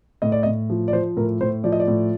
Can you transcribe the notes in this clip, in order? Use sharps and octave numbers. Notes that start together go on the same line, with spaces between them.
A2 D#5
D5
D#5
A2
F3
D5
F3 C5
A2 A#4
A2 C5
F3 D5
D#5
D5
A2